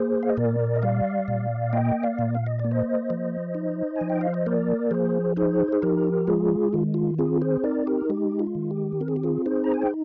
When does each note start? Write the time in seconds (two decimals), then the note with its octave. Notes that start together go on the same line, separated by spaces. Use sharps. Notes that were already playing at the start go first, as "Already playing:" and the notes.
Already playing: A#3 G#4 C5
0.23 F5
0.29 D#5
0.37 A#2 A#4 D5
0.76 D#5
0.82 G3 D5 F5
1.28 A#2
1.73 A#3 D#5 G5
2.03 D5 F5
2.19 A#2
2.35 F5
2.46 D#5
2.59 A#3 D5
2.71 C5 D#5
3.10 F3
3.55 D#4
3.96 G#5
4.01 F3
4.10 G5
4.21 F5
4.34 D#5
4.46 A#3 A#4 D5
4.91 F3 G#4 C5
5.36 D#4 G#4 C5
5.72 G#4
5.82 F3 G4 A#4
6.27 G#3 F4 G#4
6.73 D#3 F4
6.94 F4
7.18 C4 F4 G#4
7.42 G#4 C5
7.64 D#4 A#4 D5
7.87 G4 A#4
8.09 G#3 G4
8.39 F4
8.55 D#3
8.71 G4
9.01 C4 A#4
9.08 G#4
9.16 G4
9.23 F4 G#4
9.46 D#4 G#4 C5
9.64 A#5
9.74 G#5
9.82 G5